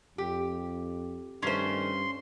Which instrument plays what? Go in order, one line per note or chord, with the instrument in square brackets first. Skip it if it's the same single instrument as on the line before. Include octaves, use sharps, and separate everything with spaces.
[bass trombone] F2 [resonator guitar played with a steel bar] G4
[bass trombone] G2 [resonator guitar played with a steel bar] D#3 A3 [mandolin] C#4 C5 [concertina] C6